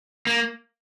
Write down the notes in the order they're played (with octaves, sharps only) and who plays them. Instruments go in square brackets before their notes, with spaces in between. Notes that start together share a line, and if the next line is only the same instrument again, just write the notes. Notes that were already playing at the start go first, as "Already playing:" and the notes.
[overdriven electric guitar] A#3